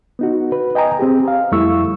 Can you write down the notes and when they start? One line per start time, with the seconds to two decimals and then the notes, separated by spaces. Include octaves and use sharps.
0.19 B3 D#4 F#4
0.52 B4
0.75 D#5 G5 G#5 A#5 D#6
0.99 C4 G4 G#4
1.28 F5
1.52 F2 G3 A3 E4 C#6 E6